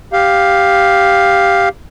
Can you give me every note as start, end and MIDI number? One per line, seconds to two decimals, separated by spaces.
0.13 1.69 67
0.13 1.69 77